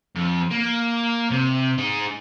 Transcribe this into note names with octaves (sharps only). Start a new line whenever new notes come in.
F2
A#3
C3
D#4 G#4